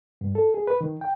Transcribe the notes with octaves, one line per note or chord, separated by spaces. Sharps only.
G2
A4
G#4
B4
D#3
G5